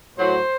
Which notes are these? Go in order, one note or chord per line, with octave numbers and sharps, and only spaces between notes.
A2 F#3 C5